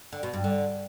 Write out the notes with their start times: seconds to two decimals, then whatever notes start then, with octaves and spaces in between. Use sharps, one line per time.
0.12 D3
0.23 B2
0.33 G2
0.44 D3